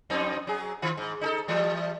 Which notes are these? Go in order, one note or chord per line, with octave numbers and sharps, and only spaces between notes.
F2 C4 D#4
F#3 G#4
D#3 F4
G#2
D#4 G#4 A4
E3 G3 A3